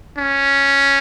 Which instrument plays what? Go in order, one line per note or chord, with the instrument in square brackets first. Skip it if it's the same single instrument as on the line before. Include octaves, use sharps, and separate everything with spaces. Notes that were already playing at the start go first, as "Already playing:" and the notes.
[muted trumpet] C#4